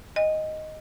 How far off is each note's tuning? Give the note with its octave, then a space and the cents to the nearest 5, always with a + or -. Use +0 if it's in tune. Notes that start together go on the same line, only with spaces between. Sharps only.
D#5 +0 G5 +45